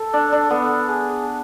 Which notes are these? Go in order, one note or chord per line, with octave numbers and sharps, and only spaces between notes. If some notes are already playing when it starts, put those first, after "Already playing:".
Already playing: A4
D4
D4
B3 A4
G#4